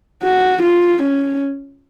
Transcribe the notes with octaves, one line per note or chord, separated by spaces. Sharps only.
F#4
F4
C#4